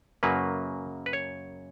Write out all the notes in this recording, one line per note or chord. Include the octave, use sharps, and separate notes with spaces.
F#2 C#3 F#3 A#3 B4
B4
C#5